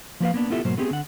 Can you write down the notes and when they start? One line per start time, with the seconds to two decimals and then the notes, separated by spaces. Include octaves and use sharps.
0.20 F3 A#3 B4 F5
0.34 A#3 B3 D4
0.50 B3 E4 F4 G4 A4 E5
0.65 G#2 B2 F#3 A#3 C5
0.77 A3 B3 C4 G4 G#4
0.90 D3 F#5